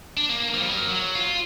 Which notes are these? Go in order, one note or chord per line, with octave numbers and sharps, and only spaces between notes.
D4
A#3
F3 G3
F#3 A#4
F#3
F4